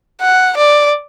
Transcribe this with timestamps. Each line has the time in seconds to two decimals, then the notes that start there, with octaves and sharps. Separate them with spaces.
0.21 F#5
0.57 D5